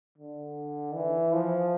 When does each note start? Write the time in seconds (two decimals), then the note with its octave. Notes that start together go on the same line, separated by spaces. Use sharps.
0.18 D3
0.95 E3
1.34 F3